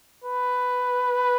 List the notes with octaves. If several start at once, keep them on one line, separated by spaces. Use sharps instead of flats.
B4